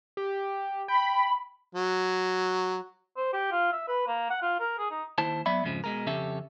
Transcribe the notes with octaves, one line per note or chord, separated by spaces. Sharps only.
G4
G5 B5
F#3
C5
G4
F4
E5
B4
A#3
F#5
F4
A#4
G#4
D#4
D#2 E4 C5 A5
F#3 B3 D5 E5 B5
F2 G#2 C#3 F3
B2 G#3 A#4
F2 C#3 C#4 G4 A4 E5